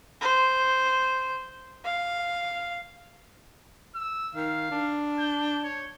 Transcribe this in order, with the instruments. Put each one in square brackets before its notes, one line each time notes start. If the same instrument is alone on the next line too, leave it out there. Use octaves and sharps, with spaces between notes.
[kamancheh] C5
F5
[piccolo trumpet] E6
[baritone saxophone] D#3 [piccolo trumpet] F5
[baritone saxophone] D4
[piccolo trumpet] G6
C#5